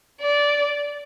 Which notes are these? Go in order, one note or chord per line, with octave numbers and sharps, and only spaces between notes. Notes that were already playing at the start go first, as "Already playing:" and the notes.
D5